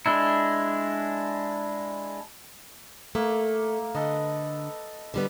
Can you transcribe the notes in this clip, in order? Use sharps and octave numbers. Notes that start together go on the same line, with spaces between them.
G#3 D4 E4
A3 A#3
D3 A4 B4 D#5
D3 G3 B3